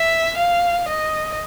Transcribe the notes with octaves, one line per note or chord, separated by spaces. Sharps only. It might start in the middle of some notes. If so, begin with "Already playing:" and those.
Already playing: E5
F5
D#5